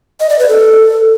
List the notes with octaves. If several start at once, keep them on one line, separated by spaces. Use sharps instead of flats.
D#5
D5
B4
A4